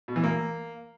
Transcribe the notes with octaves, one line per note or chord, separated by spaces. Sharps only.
B2
E3
A#3